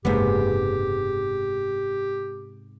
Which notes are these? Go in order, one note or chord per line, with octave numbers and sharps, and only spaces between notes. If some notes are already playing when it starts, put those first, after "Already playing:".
F#1 G#2 C3 G#3 A#3 B3 G4